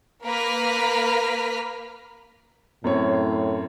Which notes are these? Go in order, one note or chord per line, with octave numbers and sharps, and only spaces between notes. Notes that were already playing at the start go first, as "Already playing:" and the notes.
A#3 A#4 B4 F6 B6
F#2 A2 C4 C#5